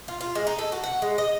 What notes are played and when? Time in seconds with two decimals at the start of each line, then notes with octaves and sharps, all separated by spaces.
0.08 F4
0.21 F4
0.35 G#3
0.47 D#4
0.59 A4
0.72 F#4
0.84 F#5
1.02 G#3
1.18 D#5